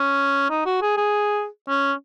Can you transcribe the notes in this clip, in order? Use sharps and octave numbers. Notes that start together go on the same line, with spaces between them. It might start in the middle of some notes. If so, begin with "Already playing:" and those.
Already playing: C#4
D#4
F#4
G#4
G#4
C#4